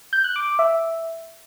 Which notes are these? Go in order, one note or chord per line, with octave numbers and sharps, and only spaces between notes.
G6
F#6
D6
D6
E5